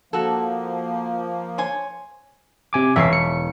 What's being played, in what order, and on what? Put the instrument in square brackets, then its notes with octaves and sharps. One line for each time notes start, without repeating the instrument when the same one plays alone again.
[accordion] F3 A#3 [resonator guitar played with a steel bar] F#4 A4
[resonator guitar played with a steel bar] C5 C#5 G#5
[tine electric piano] C3 G#5 D6
[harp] E1 C#5 C7 [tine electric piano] E5
[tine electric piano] C#7